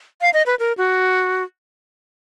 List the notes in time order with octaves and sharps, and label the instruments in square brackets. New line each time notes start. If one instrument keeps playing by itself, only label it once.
[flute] F5
D#5
B4
A#4
F#4